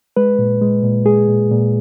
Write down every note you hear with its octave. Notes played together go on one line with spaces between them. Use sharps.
G#3 B4
A#2
G#3
A#2
G#3 G#4
A#2
A#2